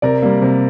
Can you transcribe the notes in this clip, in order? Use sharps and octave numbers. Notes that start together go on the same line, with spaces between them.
C3 A#4 D5
G3 A#3
C3